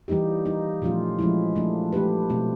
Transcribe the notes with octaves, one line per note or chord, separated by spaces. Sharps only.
E3 G3 A#3 D#4 G4
G3 A#3 D#4
A#2 F3 A3 C#4 F4
F3 G#3 C#4 E4
F3 A3 D4
A3 D4 G4 B4
B2 F#3 A3 C4